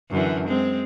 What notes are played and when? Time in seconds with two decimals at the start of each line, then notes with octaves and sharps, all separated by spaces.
0.10 F#2 D3 E3
0.48 G#3 C4